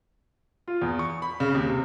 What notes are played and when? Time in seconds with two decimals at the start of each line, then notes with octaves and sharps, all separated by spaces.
0.68 F4
0.82 E2
0.99 C#6
1.22 B5
1.40 C#3
1.55 D#2
1.68 C3